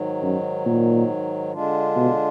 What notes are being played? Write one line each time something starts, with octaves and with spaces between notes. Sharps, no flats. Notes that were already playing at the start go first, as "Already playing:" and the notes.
Already playing: G#2 D#3 F#3
F#2
A#2
D3 G#3 D4 F4
B2